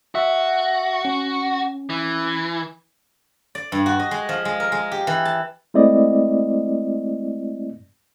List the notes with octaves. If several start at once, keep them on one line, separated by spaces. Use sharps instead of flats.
F#4 E5
C#4
E3
D5
G2
F#4
D#5
G#3
F3
G#3
A#4
G#3
G4
E3
A5
G#3 A3 C4 E4 D5 D#5